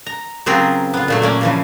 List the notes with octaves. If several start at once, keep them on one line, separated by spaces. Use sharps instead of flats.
A#5
C#3 F#3 C4 F4 G#4 A#4
B3 F4
A#2 F#3 A3
A#3 C#4 D5
C#3 E3 F3